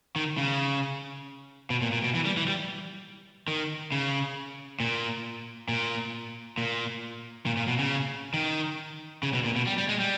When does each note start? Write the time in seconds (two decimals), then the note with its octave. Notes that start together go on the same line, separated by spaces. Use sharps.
0.16 D#3
0.38 C#3
1.70 B2
1.82 A#2
1.92 A#2
2.04 B2
2.15 E3
2.25 G3
2.37 E3
2.48 G3
3.48 D#3
3.92 C#3
4.80 A#2
5.69 A#2
6.58 A#2
7.46 A#2
7.57 A#2
7.68 B2
7.79 C#3
8.34 D#3
9.23 C#3
9.34 B2
9.44 A#2
9.56 B2
9.67 G3
9.78 G3
9.89 G#3
10.00 G3